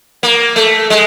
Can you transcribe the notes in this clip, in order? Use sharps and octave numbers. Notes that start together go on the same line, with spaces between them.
A#3
A3
G#3